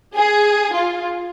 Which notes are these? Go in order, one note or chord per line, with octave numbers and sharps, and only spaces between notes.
G#4
F4